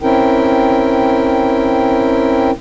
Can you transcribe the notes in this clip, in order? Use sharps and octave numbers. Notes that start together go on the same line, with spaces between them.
C4 C#4 E4 A#4 G5